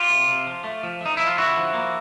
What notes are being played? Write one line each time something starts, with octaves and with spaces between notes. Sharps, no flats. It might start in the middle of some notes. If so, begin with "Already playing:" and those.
Already playing: F4 G4
C3
C3
F3
A3
F3
A3 D#4
F3 E4
F4
D3 E4 F#4
F3
A#3